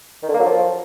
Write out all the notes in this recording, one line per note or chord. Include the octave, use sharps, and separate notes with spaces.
D#3
D3
A#3
F#3
F3